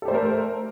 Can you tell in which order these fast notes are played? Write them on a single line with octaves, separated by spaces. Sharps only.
A4 G4 C5 A3 A#4